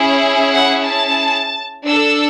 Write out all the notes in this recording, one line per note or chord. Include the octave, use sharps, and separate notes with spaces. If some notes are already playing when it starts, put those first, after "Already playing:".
Already playing: C#4 E4 G#4
F#5
A5
D4 A4 E6